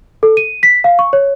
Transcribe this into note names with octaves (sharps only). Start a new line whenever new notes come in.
A4
D#7
B6
F5
C#6
C#5